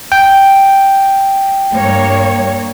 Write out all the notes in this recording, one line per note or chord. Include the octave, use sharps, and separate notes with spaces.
G5
G2 A#3 C#5